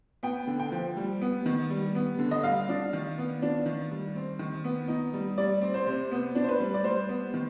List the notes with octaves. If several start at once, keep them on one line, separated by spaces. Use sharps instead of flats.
B3 G5
D3
G5
F3
G3
B3
D#3
G3
B3
D3
D#5
G3 F5
D4
D#3
B3
D4
D#3
G3
C4
D#3
B3
D#4
G3
G3 D5
C4
C5
C3
B3
D4
C5
B4
G3
D5
G3 C5
B3
D#3